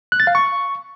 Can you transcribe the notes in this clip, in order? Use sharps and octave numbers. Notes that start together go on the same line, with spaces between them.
F#6
A6
F5
C#6